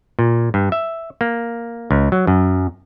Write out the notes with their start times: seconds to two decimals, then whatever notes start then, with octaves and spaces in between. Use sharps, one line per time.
0.19 A#2
0.54 G2
0.72 E5
1.21 A#3
1.91 C#2
2.12 F#3
2.27 F#2